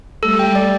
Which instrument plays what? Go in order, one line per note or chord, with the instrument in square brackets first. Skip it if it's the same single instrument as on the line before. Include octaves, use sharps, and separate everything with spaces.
[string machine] G3 A3 [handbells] A4
[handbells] G5
D5